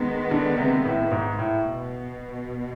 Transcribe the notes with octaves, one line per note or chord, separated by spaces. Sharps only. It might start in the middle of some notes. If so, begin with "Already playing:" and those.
Already playing: D#3 G#3 B3
D3
C3
A2
G#2
A2
B2